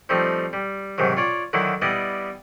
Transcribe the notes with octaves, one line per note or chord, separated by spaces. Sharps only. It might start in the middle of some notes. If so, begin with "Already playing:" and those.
F3 G3 A3 C4 D#4
G3
G#2 C3 D#3 F#3
F4 C#5 D5
D3 D#3 F#3 E4
G3 B3 E4 D5 D#5